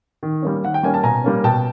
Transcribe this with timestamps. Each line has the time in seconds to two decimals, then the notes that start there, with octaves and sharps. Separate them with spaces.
0.23 D#3
0.42 G3 A#3 C#4
0.63 D#3 F#5
0.74 G5
0.83 G3 A#3 C#4 G#5
0.94 A5
1.03 B2 G#5 A#5
1.24 G3 A#3 C#4
1.44 B2 G5 A5